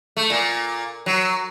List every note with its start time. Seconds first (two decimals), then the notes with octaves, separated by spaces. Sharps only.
0.17 A3
0.30 A#2
1.06 F#3